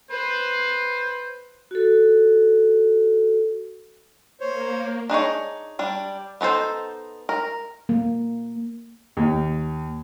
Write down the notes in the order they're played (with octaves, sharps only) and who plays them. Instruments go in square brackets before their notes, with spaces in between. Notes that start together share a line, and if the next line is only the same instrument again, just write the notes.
[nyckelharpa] B4 [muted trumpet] C5
[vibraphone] F#4 A4
[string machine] A#3 [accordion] C5 C#5
[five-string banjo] D4 D#4 G#4 C#5
G3 D4
B3 D#4 A4 C5
A#4
[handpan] A#3
[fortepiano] D#2